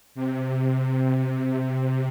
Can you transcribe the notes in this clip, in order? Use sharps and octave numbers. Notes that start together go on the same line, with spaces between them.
C3